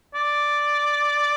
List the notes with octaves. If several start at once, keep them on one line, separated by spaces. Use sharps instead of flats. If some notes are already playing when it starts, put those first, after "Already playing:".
D5